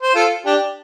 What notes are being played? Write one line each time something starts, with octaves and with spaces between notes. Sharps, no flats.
C5
F4 A4
D4 G4